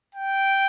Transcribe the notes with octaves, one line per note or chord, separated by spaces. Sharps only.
G5